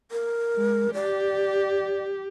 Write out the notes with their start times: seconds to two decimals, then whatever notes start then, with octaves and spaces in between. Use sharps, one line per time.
0.11 A#4
0.55 G#3
0.94 G4 D5